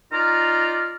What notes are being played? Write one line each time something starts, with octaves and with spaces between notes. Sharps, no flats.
D#4 F4 D5 A#5 F6